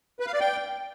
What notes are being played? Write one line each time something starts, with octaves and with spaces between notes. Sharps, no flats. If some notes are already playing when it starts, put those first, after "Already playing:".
B4
F5
D5
G5